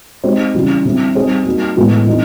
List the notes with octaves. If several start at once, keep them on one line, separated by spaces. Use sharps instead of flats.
G#3 C4 D#4 G4 C5
C#3 E3 G3
D3 G3 C4 E4
G3 C4 D#4 G#4 C5
G3 A#3 D#4 F#4
A2 E3 G#3 B3
E3 G3 C4 D#4